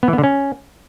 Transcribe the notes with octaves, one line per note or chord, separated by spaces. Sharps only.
B3
E3
B3
D3
C#4